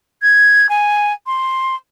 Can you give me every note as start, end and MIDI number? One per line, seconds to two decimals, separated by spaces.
0.22 0.69 92
0.69 1.13 80
1.27 1.75 84